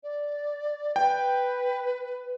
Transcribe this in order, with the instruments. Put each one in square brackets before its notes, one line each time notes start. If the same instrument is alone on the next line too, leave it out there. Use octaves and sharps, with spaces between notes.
[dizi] D5
[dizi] B4 [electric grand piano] G5